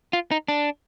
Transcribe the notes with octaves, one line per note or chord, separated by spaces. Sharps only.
F4
D#4
D4